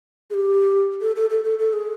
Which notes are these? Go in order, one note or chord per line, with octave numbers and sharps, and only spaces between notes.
G#4
G4
A4
A4
A4
A4
A4
G#4